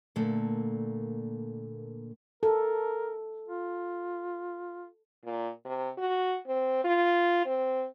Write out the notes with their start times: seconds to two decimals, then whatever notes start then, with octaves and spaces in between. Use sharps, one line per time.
0.16 A#2 D3 A3 A#3
2.43 A4 A#4
3.48 F4
5.25 A#2
5.65 C3
5.98 F#4
6.47 C4
6.84 F4
7.45 C4